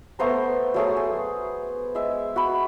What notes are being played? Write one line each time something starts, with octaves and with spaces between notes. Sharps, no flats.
A3 B3 C5 A#5
F#3 A3 G#4
G#4
G#3 E5
F#4 B5